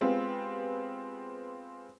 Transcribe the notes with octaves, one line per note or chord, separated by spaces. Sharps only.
G#3 B3 C4 F4 G4